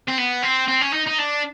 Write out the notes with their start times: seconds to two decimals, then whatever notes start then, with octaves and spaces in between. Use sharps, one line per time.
0.09 C4
0.18 B3
0.43 C4
0.68 C4
0.81 C#4
0.93 D#4
1.06 D#4
1.18 D4